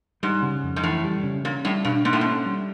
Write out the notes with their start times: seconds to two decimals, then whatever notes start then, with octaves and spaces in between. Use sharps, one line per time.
0.23 G#2 G3
0.42 C#3
0.63 F2
0.76 G#2
0.83 A2 E3
1.04 G3
1.23 C#3
1.44 A#2 C#4
1.65 A2 G3
1.85 G2 B2
2.05 G#2 A#3
2.13 A2
2.21 G#2 C#4
2.46 G3